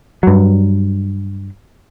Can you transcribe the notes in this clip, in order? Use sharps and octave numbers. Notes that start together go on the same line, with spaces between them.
G2 F#3